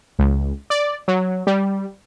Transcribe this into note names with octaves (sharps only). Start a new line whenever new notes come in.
C#2
D5
F#3
G3